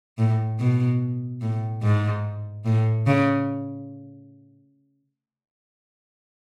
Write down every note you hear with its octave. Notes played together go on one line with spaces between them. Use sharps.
A2
B2
A2
G#2
A2
C#3